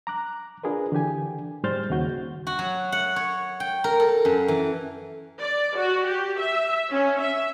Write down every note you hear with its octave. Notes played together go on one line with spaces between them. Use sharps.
A#5 D6 F#6
D4 F4 G#4 A#4 B4
D3 E3 G4 G#5
G#2 G3 C5 F6 G6 A6
D#2 C#3 F#4 G6
F#4
F#3
F#5
C#5
G5
A#4
A4
F#2
E3
D5
F#4
G4
E5
C#4
E5